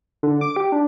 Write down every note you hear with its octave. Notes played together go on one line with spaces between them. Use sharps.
D3
D6
G4
D4